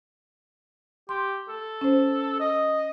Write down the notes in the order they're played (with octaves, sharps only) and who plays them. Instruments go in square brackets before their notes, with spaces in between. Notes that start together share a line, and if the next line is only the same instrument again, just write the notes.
[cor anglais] G4 [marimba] C6
[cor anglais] A4
[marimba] C#4 C5
[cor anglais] D#5